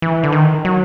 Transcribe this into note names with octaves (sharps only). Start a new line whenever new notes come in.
E3
D3
D#3
F#3